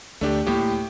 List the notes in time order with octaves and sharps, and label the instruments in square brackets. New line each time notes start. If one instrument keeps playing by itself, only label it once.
[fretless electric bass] D2 [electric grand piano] A3 D4 G4
[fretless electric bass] C#2 A3 A#3 [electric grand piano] A2 G4